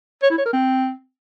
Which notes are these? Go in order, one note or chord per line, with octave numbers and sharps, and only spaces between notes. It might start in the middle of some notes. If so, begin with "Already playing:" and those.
C#5
E4
C#5
A#4
C4